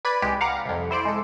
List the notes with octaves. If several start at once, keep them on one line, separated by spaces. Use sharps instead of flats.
B4 D5 B5 G#6
C2 G#3 G4
F5 F#5 A#5 D6
C2 F2
E4 C5 D5 D7
G#3 A4